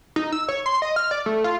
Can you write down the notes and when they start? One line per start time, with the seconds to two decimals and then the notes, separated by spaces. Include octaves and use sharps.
0.16 D#4
0.32 E6
0.48 C#5
0.66 C6
0.82 D#5
0.96 F6
1.11 D5
1.26 A3
1.44 F4